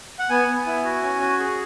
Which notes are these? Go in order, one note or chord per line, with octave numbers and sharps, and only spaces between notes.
F#5
B3 G#5
B3
E4
F#4
C#4
F#4
G#4